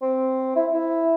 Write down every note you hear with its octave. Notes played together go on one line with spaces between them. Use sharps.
C4
E4
E4